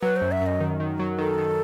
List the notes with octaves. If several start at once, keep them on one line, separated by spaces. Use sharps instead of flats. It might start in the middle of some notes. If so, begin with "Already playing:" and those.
F#3 B4
C5
F#2
E5
F#2 D#5
D#3
D#3
F#3
D#3 A4
D#3